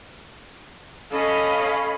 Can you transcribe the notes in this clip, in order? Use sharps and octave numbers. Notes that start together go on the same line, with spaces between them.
C#4 A4 D#5 F5 B5